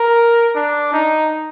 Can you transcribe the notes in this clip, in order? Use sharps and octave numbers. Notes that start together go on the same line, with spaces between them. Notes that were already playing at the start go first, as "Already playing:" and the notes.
Already playing: A#4
D4
D#4